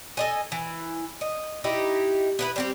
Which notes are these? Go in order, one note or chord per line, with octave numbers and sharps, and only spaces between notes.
A4 D#5 G#5
E3
D#5
D#4 E4 G4
B3 E4 B4
G3 C4 G4